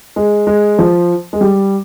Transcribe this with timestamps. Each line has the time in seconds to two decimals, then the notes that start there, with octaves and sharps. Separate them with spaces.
0.16 G#3
0.47 G#3
0.79 F3
1.33 G#3
1.41 G3